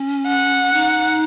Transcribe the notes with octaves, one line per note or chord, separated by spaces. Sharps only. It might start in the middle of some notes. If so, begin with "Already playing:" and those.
Already playing: C#4
F#5
D#4